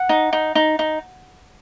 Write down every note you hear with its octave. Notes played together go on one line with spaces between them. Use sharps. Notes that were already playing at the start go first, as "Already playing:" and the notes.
Already playing: F#5
D#4
D#4
D#4
D#4